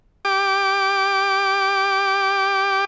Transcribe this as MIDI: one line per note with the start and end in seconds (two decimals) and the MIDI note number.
0.25 2.85 67
0.25 2.85 86